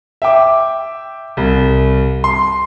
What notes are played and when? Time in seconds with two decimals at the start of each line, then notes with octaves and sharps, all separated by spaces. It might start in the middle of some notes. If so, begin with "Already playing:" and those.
0.22 E5 G5 D6
1.37 C2
2.24 C6